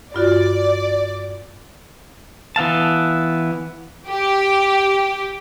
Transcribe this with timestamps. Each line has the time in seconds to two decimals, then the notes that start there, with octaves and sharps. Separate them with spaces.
0.14 G2 F4 F#4 D5
2.56 E3 B3 F5 A5
4.09 G4